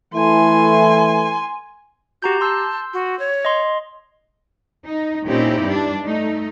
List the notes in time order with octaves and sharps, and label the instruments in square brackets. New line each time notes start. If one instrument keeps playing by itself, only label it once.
[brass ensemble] E3 A3 [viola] G#5 C6
[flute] F#4 [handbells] G4 A#5 G6
[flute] A5 [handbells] C6 E6 G6
[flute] F#4
C#5
[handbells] D#5 C6
[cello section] D#4
A#2 C4 C#4 D#4 E4 G4
G2 G3 D4
A3 D#4